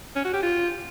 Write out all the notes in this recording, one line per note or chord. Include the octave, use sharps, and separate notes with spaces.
C#4
F#4
G4
F4